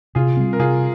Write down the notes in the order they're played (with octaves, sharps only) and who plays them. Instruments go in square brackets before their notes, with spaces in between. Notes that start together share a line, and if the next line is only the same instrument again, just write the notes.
[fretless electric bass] C3 [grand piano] F4 G#4
[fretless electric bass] G3 C4
[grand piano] A#4
[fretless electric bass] C3 [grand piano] F4 G#4